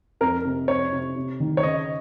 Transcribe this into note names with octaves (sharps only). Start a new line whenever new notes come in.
F2 A#4
C3
F2 C#5
C3
C3
D#3
C#5
C#3 D#5